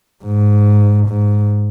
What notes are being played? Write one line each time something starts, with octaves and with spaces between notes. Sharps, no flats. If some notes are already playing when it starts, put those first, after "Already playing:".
G#2
G#2